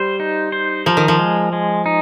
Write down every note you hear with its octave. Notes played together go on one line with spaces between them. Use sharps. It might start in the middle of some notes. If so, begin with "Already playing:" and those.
Already playing: G3 C5
D#4
C5
F3 A#4
D#3
F3
G#3
G#3
D#4